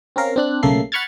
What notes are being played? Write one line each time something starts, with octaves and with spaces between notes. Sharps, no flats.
C4 C#4 A#4 F5
C4 D4 F#6
B1 C#3 A3 A#3 A4 C7
F#5 B5 C#6 F6 G#6 A6